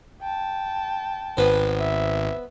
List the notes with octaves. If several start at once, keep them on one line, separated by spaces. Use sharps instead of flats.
G5 A5
G#1 B3 B4 C5
E5